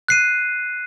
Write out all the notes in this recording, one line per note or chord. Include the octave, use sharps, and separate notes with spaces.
F#6 C7 D#7